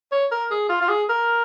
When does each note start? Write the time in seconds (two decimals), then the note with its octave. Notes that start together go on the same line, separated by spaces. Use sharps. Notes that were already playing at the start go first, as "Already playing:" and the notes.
0.12 C#5
0.31 A#4
0.51 G#4
0.69 F4
0.81 F4
0.88 G#4
1.09 A#4